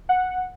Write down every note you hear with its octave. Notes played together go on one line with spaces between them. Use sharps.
F#5